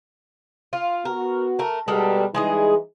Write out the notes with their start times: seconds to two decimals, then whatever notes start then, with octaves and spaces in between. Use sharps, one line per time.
0.73 F4
1.05 B3 F#4 A#4
1.59 A3 A#4
1.88 B2 G3 G#3 A4 A#4
2.34 E3 G3 G#3 D#4 G#4 D#5